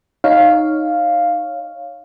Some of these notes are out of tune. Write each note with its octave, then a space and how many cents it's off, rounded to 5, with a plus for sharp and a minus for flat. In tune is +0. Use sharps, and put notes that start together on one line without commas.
D#4 -5 C#5 +0 F5 +0